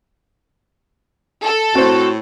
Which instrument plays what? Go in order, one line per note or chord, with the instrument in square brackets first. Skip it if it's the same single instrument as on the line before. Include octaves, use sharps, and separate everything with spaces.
[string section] A4
[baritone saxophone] A2 [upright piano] C4 C5 [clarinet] F#4